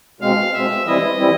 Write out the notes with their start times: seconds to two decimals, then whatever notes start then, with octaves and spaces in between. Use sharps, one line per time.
0.21 B2 G#3 C4 F5
0.54 B2 G#3 C4 E5
0.86 E3 G3 C4 E4 D#5
1.18 E3 G3 C4 E4